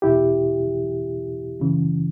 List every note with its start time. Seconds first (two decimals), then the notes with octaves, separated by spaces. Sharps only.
0.02 E2 B2 E4 G4
1.60 F#2 C#3 E3